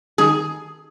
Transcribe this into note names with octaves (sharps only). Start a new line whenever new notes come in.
D#3 G#4